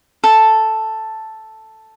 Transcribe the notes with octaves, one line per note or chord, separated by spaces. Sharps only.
A4